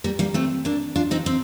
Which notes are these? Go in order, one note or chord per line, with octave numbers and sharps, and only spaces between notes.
G3 A#3
G3 A#3
A3 C4
A#3 D4
D4 F4
C4 D#4
C4 D#4